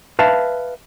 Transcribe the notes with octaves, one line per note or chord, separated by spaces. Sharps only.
B4 E5 F5 A5